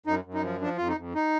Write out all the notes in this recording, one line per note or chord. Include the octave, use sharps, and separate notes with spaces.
F#2 D#4
F#2
D#4
F3
F3 D4
F2 F4
D#4
F2
D#4